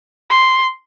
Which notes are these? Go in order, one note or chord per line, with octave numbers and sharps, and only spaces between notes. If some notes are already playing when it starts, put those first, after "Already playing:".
C6